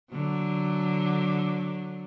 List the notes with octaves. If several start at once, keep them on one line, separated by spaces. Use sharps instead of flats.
D3 F#3